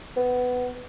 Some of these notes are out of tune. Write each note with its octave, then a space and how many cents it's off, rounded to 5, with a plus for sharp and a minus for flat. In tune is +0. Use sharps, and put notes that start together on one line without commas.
B3 +10